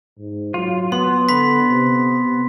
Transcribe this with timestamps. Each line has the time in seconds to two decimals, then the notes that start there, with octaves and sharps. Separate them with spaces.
0.19 G#2
0.54 F#3 F4
0.92 B3 C6
1.29 D3 B5 B6
1.69 C3